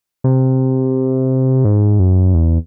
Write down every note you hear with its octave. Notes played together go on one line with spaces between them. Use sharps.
C3
G#2
F#2
E2